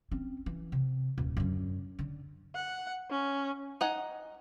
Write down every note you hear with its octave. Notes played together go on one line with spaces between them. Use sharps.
C4 C#4
E3
C3
D#1 C2
F#2 D3
D3
F#5
C#4
D#4 F#5 G#5